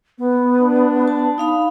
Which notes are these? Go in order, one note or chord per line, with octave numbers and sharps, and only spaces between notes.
B3
D4
A5
D#4 F5 B5